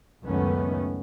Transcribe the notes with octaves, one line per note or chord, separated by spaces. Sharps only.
C#2 F#2 D#3 A3 B3 C#4